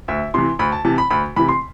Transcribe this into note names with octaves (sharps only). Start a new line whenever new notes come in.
D2 E5
C3 E3 C6
D2 B5
A5
C3 E3 A5
B5
D2 B5
C3 E3 B5
C6